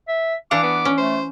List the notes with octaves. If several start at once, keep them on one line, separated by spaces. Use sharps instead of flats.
E5
E3 D4 F5 F#5 D6
B3
C#4
A3 C5